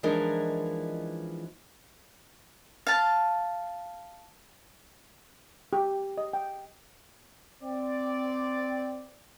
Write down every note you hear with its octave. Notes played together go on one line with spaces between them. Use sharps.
E3 F3 G#3 D4 D#4 A#4
F5 A5
G4
D#5
G5
C4 D5